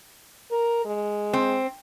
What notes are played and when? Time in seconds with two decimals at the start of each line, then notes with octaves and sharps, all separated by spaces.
0.51 A#4
0.85 G#3
1.33 C4